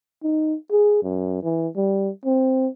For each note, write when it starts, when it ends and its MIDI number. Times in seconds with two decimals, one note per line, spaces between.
0.24 0.55 63
0.72 1.00 68
1.03 1.42 42
1.43 1.68 52
1.76 2.10 55
2.25 2.68 60